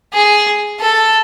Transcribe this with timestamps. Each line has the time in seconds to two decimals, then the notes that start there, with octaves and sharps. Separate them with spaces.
0.14 G#4
0.80 A4